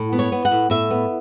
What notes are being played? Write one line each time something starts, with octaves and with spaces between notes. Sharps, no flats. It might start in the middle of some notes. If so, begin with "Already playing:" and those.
Already playing: A2
B3
C#5
B3
F#5
A2
A2 E5
B3